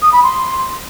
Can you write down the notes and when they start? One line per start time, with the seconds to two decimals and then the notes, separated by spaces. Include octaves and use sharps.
0.02 D#6
0.13 B5
0.23 C6